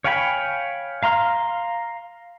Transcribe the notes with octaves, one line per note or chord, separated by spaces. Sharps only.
C#5 F5 G5 G#5 B5
F5 A#5 C6 F6